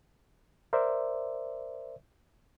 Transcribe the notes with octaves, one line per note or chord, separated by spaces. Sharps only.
A#4 C5 D5 E5